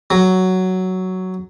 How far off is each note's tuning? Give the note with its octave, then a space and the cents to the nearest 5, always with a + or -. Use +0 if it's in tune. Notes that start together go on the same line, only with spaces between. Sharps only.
F#3 +5